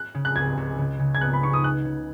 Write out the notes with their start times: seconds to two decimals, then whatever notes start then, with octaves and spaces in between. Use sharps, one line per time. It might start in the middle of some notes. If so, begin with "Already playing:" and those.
Already playing: F#6
0.15 C#3
0.25 F#6
0.36 C#2 G#6
0.57 C#2
0.78 C#3
0.99 C#3
1.15 G#6
1.21 B3 F#6
1.33 B5
1.43 D#4 C#6
1.53 D#6
1.64 B3 F#6
1.85 C#3